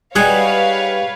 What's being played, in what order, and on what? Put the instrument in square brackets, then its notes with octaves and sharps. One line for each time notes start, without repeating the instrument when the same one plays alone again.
[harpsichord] G3 D#4 [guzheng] G#4 F#5 G#5 [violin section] B4 C#5 F5